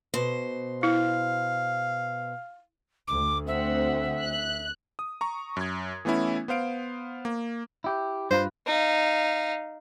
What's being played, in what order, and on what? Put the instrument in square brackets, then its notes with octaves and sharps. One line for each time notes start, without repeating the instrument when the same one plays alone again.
[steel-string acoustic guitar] B2 C5
[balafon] E4 [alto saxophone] F5
[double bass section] D2 [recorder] D6
[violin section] C4 F#5 [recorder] E5
[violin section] F#6
[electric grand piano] D#6
A#5 C#6
F#2 G#6
E3 A3 B3 C#4 E4
B3 C5 F5 D7
A#3
[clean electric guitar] E4 G4
[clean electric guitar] G2 F4 B4 [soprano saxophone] C5
[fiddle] D#4 F5